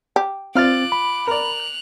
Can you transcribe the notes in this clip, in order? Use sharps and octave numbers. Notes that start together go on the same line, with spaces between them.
G4
C4 F4 D6 F6 F#6 A6
B5
A#4 D5 F#6 F7